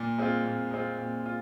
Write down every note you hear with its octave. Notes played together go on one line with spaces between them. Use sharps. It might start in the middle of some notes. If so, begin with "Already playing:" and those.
Already playing: A#2
G#3 C4 F4
A#2
G#3 C4 F4
A#2
F4